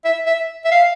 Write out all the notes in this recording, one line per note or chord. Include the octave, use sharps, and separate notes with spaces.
E5
E5
E5
F5